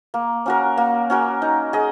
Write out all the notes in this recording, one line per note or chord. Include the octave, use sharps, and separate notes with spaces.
A#3
C#4 F#4 A#4
A#3
C#4 F#4 A#4
D#4
G#4 D#5